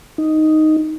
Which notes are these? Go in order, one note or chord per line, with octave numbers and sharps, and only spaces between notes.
D#4